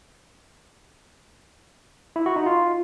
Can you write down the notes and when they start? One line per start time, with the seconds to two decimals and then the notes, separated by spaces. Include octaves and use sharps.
2.16 E4
2.26 F#4
2.36 D#4
2.46 F4